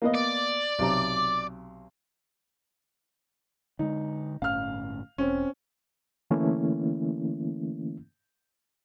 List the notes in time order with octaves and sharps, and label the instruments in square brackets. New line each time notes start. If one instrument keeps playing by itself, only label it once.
[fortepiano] A#3 B3 D#5
[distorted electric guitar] D5
[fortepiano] B1 C3 A#5
[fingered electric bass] D3 G#3 [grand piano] D#4
[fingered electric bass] G1 A2 C#4 [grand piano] F5 F6
[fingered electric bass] E1 [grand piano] C4 C#4
[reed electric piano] D3 E3 A3 A#3 C#4 E4